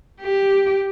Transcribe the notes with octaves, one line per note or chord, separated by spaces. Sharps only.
G4